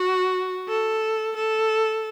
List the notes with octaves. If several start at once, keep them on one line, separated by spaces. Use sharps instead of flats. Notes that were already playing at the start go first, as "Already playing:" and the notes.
Already playing: F#4
A4
A4